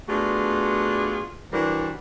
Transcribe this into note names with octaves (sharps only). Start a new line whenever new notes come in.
A3 B3 D4 F4 F#4 G#4
E3 G3 D4 F#4 A#4 C5